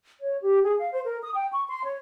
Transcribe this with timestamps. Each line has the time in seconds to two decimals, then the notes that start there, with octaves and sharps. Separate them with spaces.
0.21 C#5
0.42 G4
0.62 G#4
0.78 F5
0.92 C5
1.04 A#4
1.23 D#6
1.34 G5
1.52 C#6
1.68 C6
1.84 C#5